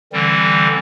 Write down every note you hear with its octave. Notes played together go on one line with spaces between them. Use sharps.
D3 E3 G3 C4